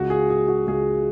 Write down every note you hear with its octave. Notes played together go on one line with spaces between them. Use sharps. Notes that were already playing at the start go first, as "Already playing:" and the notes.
Already playing: C#2 C#3 G#3 F#4
G#4
G#4
F#4
C#2 C#3 G#3 G#4